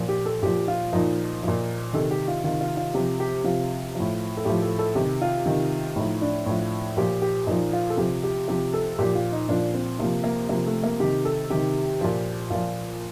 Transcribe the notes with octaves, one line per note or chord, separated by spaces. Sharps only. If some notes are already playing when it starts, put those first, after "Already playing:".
Already playing: A#2 F3
G4
A4
A#2 F3 G4
F4
A#2 F3 D#4
A#2 F3
C3 D#3 A4
G4
F4
C3 D#3 F4
F4
F4
C3 F3 G4
G4
C3 F3 F4
F3
A2
A4
A2 F3 G4
A4
A4
C3 D#3 G4
F4
C3 D#3
A2 F3 D#4
D4
A2 F3
A#2 F3 G4
G4
A#2 F3 D#4
F4
A4
C3 F3 G4
G4
C3 F3 G4
A4
A#2 F3 G4
F4
D#4
A#2 F3 D4
C4
C3 F3 A#3
A#3
C3 F3 A#3
A3
A#3
C3 D#3 G4
A4
C3 D#3 G4
A#2 F3
A#2 F3 F4